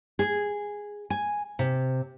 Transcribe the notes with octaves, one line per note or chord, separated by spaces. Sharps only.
G#4
G#5
C3